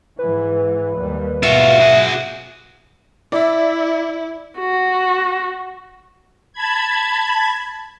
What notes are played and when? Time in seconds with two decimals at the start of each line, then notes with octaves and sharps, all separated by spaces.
0.19 G#2 E3 B4
0.97 D#2 G3
1.43 G#2 B2 F4 F#4 E5
1.80 F#4 G#4
3.32 E4 D5 E5
4.58 F#4
6.53 A5 B5 G#6